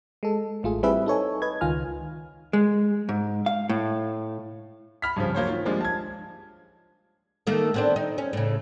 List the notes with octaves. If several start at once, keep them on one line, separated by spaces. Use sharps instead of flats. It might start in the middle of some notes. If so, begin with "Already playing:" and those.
G#3 A4
A1 A3 F4 G#4
G3 C4 E4 G#4 B4 E5
D#4 A4 C#5 G#5
B4 D#5 G#6
C#2 D#3 F4 G#5 F6
G#3
G#2
F5
A2
B5 F6 B6
G2 C#3 F3
F#3 A#3 C5 C#5
D#3 F4
F3 G3 G#3 A#3 D4 F4
A5 G#6
D#3 A3 A#3
B3 C4 D4
D#4
C#4
A2 C#3